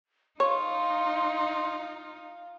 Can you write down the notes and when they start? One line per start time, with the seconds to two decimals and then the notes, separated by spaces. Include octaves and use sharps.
0.40 D#4 F4 C#5 F5 C6